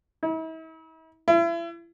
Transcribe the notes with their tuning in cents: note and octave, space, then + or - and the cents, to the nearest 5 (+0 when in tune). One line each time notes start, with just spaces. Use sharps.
E4 -45
E4 +35